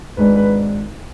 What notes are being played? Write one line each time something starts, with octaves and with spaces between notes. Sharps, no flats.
G#1 G#2 G#3 D4 B4
B4